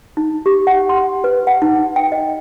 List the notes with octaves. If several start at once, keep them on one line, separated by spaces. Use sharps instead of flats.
D#4
G4
F#5
C6
B4
F#5
D#4
G5
D#5